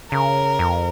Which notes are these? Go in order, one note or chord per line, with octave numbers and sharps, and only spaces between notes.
C#3 A#4
F2